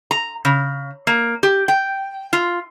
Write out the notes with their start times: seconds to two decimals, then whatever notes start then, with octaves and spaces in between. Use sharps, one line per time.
0.11 A#5
0.45 C#3
1.07 A#3
1.43 G4
1.68 G5
2.33 F4